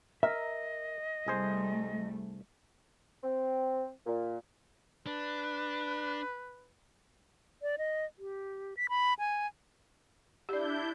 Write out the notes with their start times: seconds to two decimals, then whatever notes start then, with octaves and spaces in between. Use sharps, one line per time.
0.23 A#4 D#5 E5
1.26 C2 G3 A3 G#4 C5
3.24 C4
4.07 A#2
5.07 D4 B4
7.62 D5
7.78 D#5
8.19 G4
8.77 B6
8.89 B5
9.19 G#5
10.49 D4 E4 G4 D5 G6